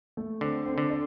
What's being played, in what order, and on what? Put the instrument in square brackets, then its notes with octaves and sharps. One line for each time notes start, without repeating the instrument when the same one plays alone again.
[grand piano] A3
[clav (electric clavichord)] D3 [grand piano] C4
[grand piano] C4
[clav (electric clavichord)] D3
[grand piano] D5